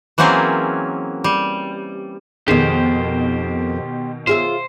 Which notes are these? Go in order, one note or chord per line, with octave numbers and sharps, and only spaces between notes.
E3 F#3 A#3 C4 C#4 G#4
G3
F2 B2 D#3 G4 G#4 C5
F4 G#4 C5 E5